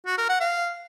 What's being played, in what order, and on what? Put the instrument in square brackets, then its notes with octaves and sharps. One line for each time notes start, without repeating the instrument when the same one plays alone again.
[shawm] F#4
A#4
F#5
F5